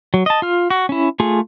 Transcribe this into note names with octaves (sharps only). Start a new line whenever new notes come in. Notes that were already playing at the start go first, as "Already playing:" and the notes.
F#3
D#5 A5
F4 F6
F#4
C#4 E4
A3 F4 G#4